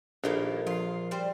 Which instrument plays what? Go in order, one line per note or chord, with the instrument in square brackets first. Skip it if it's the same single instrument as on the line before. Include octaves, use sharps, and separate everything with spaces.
[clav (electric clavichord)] A#1 [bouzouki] D#3 A#3 B3 [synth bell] D4 G4 A4
[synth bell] F3 C7 [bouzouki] F4
[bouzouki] G3 C5